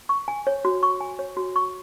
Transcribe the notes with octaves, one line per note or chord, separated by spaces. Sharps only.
C#6
G#5
C#5
F#4
C#6
G#5
C#5
F#4
C#6